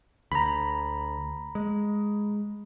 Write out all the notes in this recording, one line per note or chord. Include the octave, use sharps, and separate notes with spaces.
D2 A#5 B5
G#3